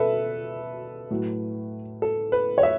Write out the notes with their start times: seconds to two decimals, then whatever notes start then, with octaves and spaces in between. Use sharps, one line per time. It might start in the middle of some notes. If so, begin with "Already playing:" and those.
Already playing: B2 A4 B4 E5
1.11 A2 F#3
2.02 A4
2.32 B4
2.58 C#5
2.63 E5